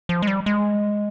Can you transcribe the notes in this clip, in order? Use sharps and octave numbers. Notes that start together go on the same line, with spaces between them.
F3
G#3
G3
G#3